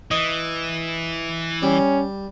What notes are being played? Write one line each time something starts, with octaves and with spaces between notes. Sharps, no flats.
E3 D#5
G3 C#4